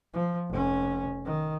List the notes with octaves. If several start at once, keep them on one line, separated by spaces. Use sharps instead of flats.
F3
F1 C#4
D#3